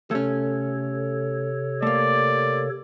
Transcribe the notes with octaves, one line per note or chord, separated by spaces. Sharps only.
C3 A3 C#4 A4 C#5
A3 A#3 D5